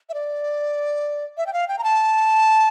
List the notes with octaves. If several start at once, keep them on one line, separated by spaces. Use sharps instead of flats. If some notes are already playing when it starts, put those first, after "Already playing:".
E5
D5
E5
G5
F5
G5
A#5
A5